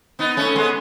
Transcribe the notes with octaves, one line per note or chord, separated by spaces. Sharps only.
B3 D#4
A3 C#4
G#3 B3